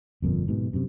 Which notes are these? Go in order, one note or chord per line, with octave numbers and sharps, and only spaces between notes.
G1 F2 A#2
G#2 B2
F#2 C3